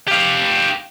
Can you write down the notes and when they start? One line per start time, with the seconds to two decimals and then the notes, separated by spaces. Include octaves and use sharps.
0.08 G4 F5